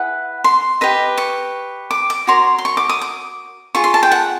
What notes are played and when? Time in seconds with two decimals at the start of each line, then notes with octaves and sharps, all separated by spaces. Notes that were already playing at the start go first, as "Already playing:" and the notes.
Already playing: E4 G#4 B4 F#5
0.44 C6
0.81 G4 B4 D#5
1.18 C#6
1.91 D6
2.10 D6
2.27 F#4 A#4 C#5 C6
2.58 C6
2.65 C#6
2.77 D6
2.89 D#6
3.01 D6
3.75 F4 G#4 C#6
3.84 C6
3.94 A5
4.03 G5
4.12 F#5